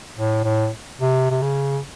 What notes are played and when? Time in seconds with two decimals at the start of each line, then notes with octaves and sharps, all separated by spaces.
0.16 A2
0.44 A2
1.00 C3
1.30 C3
1.41 C#3